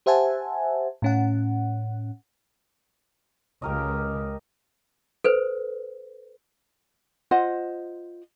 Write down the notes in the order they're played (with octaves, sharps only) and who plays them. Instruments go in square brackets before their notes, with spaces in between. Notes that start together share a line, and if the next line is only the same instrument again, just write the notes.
[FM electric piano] G4 C5 E5 F#5 G#5 A5
A2 C#4 F#5
[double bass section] C#2 C#3 [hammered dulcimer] G4 A#4 D#5
[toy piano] A4 B4 C5
[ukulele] F4 C5 D#5 F#5